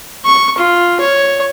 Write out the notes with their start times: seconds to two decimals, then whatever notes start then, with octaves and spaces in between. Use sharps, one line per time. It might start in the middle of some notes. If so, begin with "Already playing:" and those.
0.25 C#6
0.58 F4
1.00 C#5